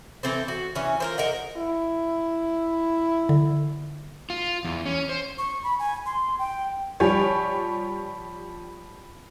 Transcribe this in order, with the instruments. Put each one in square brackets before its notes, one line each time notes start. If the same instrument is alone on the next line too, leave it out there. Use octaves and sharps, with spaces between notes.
[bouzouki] E3 C4 A4 C5
F#4
E3 C#4
F4 A#4 C5
A#4 D#5 F#5
[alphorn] E4
[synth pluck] D3
[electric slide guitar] F4
E2
C#4
C5
[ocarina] C#6
B5
G#5
C6
G5
[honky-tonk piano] F3 G3 G4 C#5 G#5